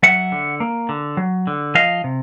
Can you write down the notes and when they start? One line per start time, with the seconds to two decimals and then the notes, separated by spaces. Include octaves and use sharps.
0.03 F#3 E5 F#5
0.32 D3
0.60 A#3
0.89 D3
1.17 F#3
1.47 D3
1.75 F3 D#5 F5
2.04 C3